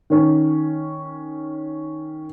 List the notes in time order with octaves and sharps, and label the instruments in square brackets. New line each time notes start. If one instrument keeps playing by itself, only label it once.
[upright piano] D#3 C#4